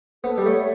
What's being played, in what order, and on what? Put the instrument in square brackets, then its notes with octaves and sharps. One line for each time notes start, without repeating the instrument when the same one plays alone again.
[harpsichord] B3 [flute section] A4
[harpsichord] G3
[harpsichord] A3 [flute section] C#5 E5